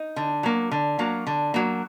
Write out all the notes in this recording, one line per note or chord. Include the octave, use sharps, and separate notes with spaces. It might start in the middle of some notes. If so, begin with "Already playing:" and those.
Already playing: D#4
D3
F#3 A#3
D3
F#3 A#3
D3
F#3 A#3